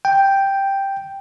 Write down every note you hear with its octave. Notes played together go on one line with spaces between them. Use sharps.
G5